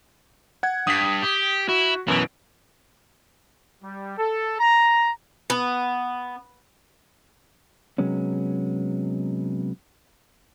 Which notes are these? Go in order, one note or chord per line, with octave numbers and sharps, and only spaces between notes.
F#5 G#6
G2 D#6 B6
G4
E4 F#4
F#2 B2 E3 D7
G3
A4
A#5
B3
C3 F#3 G#3 B3 C#4